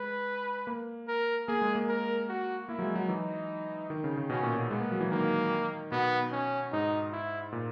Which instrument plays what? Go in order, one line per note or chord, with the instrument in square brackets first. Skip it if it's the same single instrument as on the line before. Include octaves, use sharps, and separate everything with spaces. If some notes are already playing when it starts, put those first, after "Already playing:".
Already playing: [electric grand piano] G#3 [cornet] B4
[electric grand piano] A#3
[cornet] A#4
[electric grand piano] A#3 [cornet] G#4
[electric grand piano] G#3
A#3
[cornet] A#4
F#4
[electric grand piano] A#3 [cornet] E4
[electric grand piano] F#3
G#3
F#3
[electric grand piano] E3 [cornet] D#4
[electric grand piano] D#3
C#3
C#3
[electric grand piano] B2 [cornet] C#4
[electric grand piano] A#2
B2
[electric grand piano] G#3 [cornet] B3
[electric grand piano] A#3
F#3
E3
[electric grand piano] D#3 [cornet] A#3
[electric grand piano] B2 [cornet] B3
[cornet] C#4
[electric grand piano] G#2 [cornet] D#4
[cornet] E4
[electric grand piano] A#2